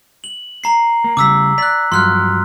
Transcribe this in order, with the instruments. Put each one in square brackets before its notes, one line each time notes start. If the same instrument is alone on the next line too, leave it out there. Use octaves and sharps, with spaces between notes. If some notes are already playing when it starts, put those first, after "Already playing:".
[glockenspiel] F#7
A#5 C7
[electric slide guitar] A#3
[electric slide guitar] C#3 G3 [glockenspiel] D6 E6 B6
[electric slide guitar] D5 [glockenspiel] F#6 B6
[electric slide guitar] G2 F3 F#3 [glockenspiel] C6 F6 F#6